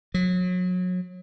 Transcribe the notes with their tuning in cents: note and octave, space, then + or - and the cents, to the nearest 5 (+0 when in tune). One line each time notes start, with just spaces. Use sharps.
F#3 -30